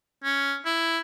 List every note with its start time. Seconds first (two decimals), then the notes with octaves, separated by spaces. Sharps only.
0.24 C#4
0.65 E4